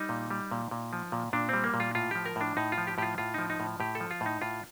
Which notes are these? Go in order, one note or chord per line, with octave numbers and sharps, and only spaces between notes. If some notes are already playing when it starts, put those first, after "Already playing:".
Already playing: G3 D#4
A#2
G3
A#2
A#2
F3
A#2
A#2 D4
G3 C4
A#3
A#2
F4
A2 F4
F3 G4
A#4
A2 D4
A2 D#4
F4
F3
G4
A2 F4 G4
A2 F4
F3 D#4
D#4
A2
A2 G4
A4
F3
F4
A2 D#4
A2 F4